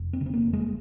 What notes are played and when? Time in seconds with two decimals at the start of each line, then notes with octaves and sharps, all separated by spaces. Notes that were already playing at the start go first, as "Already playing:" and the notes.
Already playing: F1
0.13 C4
0.21 C#3
0.26 C4
0.34 A#3
0.46 F1
0.53 G#3